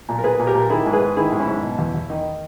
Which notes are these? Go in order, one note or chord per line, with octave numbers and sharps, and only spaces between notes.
A#2
A#4
A#2 G#4 B4
A#2
G4 A#4
A#2
D#3 E4 G#4
G#2
G#4 B4
G#2
D#3 E4 G#4
G#2
C#4 E4
G#2
B2
E2
E2
D#3 D#4